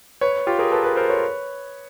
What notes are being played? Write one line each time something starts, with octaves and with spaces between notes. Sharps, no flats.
B4 C#5
F4 G4
G#4 A#4
A4 B4
A4 B4
A#4 C5
B4 C#5